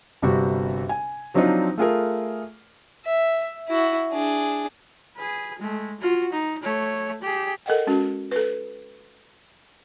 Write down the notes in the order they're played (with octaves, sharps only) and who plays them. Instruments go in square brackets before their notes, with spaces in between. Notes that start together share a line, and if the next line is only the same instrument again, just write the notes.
[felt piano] G1 C3 G3 F#4
G#5
F3 F#3 C4 D4 D#4 F4
A3 F4 G#4 A#4
[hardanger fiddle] E5
E4 F#4
D4 G#4
[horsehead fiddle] G#4 B4
G#3 A3
F4 F#4
D#4
A3 C#5
G4 G#4
[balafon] A4 A#4 D#5 F#5 G5
G#3 C#4 F#4
A4 B4